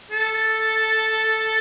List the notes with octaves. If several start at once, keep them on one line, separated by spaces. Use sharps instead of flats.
A4